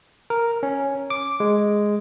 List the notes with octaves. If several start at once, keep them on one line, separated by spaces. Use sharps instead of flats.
A#4
C#4
D6
G#3